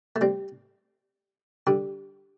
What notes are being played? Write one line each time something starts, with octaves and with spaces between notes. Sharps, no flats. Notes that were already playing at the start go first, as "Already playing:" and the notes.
A3
G3 C4
D3 G3